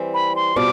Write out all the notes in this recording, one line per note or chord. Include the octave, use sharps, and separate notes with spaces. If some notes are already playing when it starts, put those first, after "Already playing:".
Already playing: E3 G3 C4
B5
C6
B2 G3 C4 F4 D6